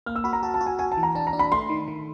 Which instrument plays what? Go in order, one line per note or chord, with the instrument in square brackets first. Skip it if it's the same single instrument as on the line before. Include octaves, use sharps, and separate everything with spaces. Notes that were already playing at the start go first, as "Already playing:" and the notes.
[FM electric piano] A#3 [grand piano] F6
[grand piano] E6
[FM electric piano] F#4 [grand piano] B5
[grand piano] A#5
[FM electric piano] F#4 [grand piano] A5
[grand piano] A5
[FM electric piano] F#4
[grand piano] G#5
[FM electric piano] F#4 [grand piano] G#5
[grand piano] A5
[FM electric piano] E3
[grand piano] A#5
[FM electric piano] D4 [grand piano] A5
[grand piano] A#5
[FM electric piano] D4
[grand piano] B5
[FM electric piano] A3 [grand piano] C6
[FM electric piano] D#3
D#3